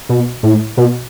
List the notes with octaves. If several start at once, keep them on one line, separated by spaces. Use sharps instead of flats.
B2
A2
B2